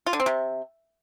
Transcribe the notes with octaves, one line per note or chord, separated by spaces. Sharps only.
F4
D3
C4
C3